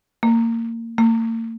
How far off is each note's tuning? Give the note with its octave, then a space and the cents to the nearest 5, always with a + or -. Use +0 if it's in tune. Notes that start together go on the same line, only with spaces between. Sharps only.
A#3 -25
A#3 -45